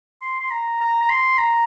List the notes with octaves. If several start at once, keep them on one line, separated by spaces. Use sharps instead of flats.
C6
C6
A#5
A#5
A#5
C6
A#5